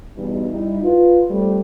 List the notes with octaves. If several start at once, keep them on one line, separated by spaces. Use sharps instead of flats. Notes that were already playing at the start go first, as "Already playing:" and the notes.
E2 G2 B2 E3 D#4
G3 D#4 E4
F4 B4
G3 A3 C4